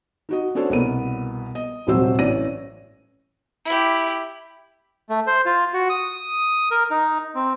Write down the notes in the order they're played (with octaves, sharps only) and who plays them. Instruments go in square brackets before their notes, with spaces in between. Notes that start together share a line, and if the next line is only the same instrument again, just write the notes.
[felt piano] D#4 F#4 D#5
C#4 D4 F#4 A4 C5 C#5
C2 B2 A#3 B3 A#4 D#7
D#5
D#1 G#1 C3 F#3 C5 E6
A1 C#4 D5 A#6 D#7
[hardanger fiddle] E4 G4
[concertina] A3
C5
F4
F#4
D#6
A#4
D#4
C4